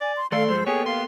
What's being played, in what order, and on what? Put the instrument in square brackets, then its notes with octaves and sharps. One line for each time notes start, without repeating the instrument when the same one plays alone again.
[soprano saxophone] D5 [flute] G#5
[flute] C6
[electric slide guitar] D#3 A3 D5 [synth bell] A4 [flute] F5 [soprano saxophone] C6
[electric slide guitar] G2 F3 G#3 [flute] C5
[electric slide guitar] A#3 B3 G4 [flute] G#4 [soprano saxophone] C#5
[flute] F5 [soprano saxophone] C6